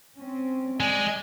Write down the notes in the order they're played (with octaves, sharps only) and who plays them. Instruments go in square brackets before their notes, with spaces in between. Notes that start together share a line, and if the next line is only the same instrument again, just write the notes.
[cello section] C4 C#4
[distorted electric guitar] G#3 [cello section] D5 [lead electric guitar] G#5